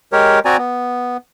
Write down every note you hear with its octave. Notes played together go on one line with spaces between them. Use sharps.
G#3 G4 A#4 C#5
C4 F#4 D5 G#5 A#5
B3